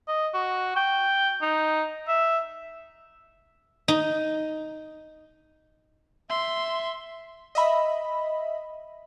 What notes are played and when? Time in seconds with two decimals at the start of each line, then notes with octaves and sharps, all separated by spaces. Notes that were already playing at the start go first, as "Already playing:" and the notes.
0.08 D#5
0.34 F#4
0.76 G5
1.42 D#4
2.08 E5
3.88 D#4
6.30 E5 C6
7.55 D#5 E5 B5